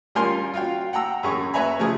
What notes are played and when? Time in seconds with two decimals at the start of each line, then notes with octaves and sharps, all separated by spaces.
0.15 G3 C#4 F4 A#4 G#5 C6
0.54 F4 F#4 F5 G5
0.93 F#5 G5 A#5 E6
1.23 F#2 C#4 G#4 C#6
1.54 B4 C#5 E5 G#5 A#5 B5
1.79 C#3 F3 A3 G#4